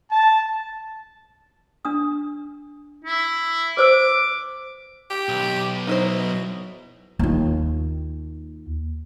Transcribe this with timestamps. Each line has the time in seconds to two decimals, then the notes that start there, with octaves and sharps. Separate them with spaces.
0.11 A5
1.85 D4 D#6
3.05 E4
3.77 B4 C5 D6 E6
5.10 G4
5.29 B1
5.87 B2 F#3 D#4 E4 C5
7.19 D#2 F4